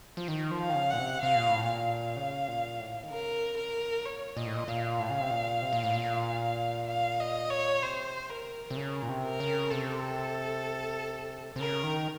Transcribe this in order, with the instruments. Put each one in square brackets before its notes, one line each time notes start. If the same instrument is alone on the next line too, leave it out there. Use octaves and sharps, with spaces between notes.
[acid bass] F3
[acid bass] D#3 [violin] A#4
[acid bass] F3
[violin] F5
[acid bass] D#3
C#3
[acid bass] A#2 [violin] F#5
[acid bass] C3
[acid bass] C3 [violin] F5
[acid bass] A#2
A2
A#2
[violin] F5
[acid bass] C#3
A#2
A2
D#3
[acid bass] C#3 [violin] A#4
[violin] A#4
[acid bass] A#2 [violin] C#5
[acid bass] A#2 [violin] D#5
[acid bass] A2
A#2
[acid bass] A#2 [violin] F5
[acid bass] A2
C#3
C3
A#2
C3
A#2
A2
A#2
[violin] F5
D#5
C#5
[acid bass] C3 [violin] C5
[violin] A#4
[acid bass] C3
[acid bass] C#3 [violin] A#4
[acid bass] A#2
C3
[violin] A#4
[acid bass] C#3
[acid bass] C3 [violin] A4
[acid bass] C3
[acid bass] C#3 [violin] A#4
[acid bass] D#3